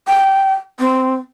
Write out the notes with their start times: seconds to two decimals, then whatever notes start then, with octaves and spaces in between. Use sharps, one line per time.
0.07 G5
0.79 C4